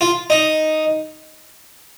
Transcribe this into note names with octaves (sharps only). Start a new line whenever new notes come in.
F4
D#4